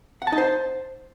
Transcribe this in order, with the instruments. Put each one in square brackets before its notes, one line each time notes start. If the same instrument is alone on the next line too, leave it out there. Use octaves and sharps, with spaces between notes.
[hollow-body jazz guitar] F#5
A5
D#4
C5